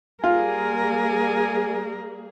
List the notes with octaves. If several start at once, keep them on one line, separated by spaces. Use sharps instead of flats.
G3 A#3 F4 G#4 A#4 G#5